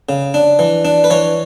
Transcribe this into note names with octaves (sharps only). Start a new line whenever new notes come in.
C#3
D4
E3
D4
B4
E3 C#5